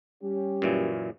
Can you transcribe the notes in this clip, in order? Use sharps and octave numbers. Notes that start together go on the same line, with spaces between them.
G3 C#4 G4
F#2 A#2 E3